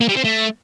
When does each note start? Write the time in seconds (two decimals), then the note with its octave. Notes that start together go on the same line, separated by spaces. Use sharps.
0.01 A#3
0.08 G3
0.16 C4
0.24 A3